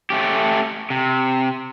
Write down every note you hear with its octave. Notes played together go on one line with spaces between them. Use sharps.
A3 C#4 G4
C3